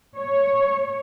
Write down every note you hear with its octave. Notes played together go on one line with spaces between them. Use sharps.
C#5